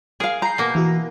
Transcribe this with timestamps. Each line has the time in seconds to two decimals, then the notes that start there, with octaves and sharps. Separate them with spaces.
0.20 G#4 A#4 F5
0.42 A#5 G6 C7
0.58 B2 A#3
0.75 E3 E4 F#4